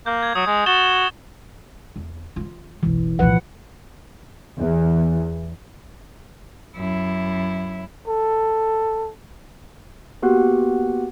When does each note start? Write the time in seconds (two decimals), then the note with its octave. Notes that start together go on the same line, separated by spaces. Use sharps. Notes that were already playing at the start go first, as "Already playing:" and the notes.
0.06 A#3 G6
0.22 G#6
0.35 F#3 D#6
0.47 G#3
0.66 F#4 A6 E7 G7
1.96 E2
2.36 E3 F4
2.83 F#1 B1 E3
3.19 C2 A#2 F3 B4 F#5
4.59 E2
6.76 F#2 E4
8.08 A4
10.22 A#3 B3 F#4 G4 F#5 F#6